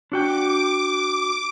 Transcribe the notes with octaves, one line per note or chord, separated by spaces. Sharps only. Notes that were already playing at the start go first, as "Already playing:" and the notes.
D4 F#4 G5 D6